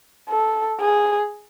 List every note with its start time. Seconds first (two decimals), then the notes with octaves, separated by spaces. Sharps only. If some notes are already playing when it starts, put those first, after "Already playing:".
0.29 A4
0.80 G#4